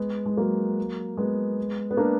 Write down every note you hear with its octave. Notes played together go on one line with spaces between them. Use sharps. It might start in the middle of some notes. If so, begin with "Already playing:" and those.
Already playing: G#3 B3
G#3
F#3 A#3
G#3 B3
B3
A#3 D4